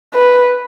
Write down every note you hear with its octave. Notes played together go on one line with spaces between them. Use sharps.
B4